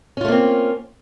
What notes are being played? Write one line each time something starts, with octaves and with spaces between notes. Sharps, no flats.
A3 A#3 C4 C#4 F4